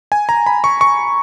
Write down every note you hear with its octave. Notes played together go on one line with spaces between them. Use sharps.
G#5
A#5
B5
C#6
C#6